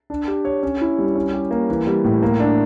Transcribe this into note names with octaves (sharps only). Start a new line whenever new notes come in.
D4
G4
C#5
C#4
E4
G3
C#4
G4
A#3
E3
G3
A2
A#3
D4